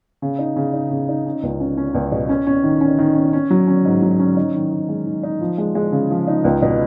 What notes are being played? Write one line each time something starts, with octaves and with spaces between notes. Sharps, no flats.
C#3
D#4
C#3
D#4
C#3
D#4
C#4
C#2
C#4
C#4
C#2
B2
C#4
C#4
D#3
C#4
D#3
C#4
C#4
F#3
C#4
G#2
F#3
C#4
D#4
D#3
D#3
G#3
D#3
D#4
F3
G#3
G#3
C#3
F3
D#4
C#2
B2